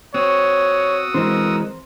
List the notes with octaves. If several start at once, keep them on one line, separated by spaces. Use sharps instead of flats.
C4 F#4 C#5 D#6 E6
E3 G#3 C4 A#4